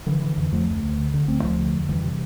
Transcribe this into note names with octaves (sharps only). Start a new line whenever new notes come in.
D3 E3
D3 E3
F2 E3
F2 F3 A3
D2
D2
D3
D3
D2 A3 C4
D2 F3 A3
D3
E2
F2 E3 G3
C3